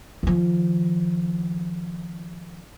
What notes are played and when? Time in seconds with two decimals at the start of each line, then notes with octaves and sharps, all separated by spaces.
0.23 D#3 F3